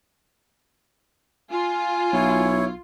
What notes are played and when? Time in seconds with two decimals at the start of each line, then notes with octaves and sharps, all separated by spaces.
1.51 F4 G#5
2.13 B1 E4 C#5